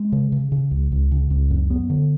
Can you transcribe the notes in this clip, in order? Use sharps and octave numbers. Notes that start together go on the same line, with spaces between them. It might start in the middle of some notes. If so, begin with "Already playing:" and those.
Already playing: G#3
C#3
C#3
C#3
C#2
C#2
C#3
C#2
F#2
B3
D3